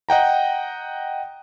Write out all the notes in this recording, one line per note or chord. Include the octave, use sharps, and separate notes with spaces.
D#5 F#5 G5 A#5